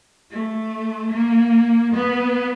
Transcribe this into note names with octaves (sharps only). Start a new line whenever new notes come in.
A3
A#3
B3